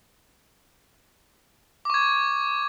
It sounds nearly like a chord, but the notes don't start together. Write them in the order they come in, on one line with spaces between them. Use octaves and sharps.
D6 C#6 G#6